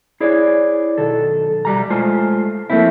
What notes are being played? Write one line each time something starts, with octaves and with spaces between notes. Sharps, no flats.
E4 G#4 C#5 D5
B1 D#3 A4
B2 G3 A#5
G#3 A3 F4 C5
F3 A3 A#3 C4 E4